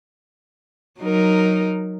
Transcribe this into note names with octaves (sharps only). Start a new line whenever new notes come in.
F#3 D#4 A#4